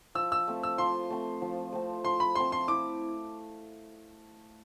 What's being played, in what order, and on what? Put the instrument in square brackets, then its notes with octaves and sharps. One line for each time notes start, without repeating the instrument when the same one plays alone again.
[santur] F3 [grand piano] E6
[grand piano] E6
[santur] A3 C4
[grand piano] E6
[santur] F3 [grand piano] C6
[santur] A3 C4
F3
A3 C4
[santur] F3 [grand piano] C6
[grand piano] B5
[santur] A3 C4 [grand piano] C6
[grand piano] C6
[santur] E4 [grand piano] D6